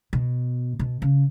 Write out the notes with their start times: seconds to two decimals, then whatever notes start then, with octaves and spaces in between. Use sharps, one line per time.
0.13 B2
0.79 B2
1.02 C#3